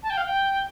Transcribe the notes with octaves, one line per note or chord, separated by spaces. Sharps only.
A5
G5
F5
G5